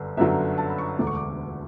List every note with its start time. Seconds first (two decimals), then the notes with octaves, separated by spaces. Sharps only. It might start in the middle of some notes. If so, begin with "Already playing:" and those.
Already playing: G1 F#2 D3
0.17 G1 F#2 D3 F#3 E5
0.58 A5
0.70 B5
0.78 C#6
0.99 E1 D2 D3 D6
1.07 C#6
1.15 D6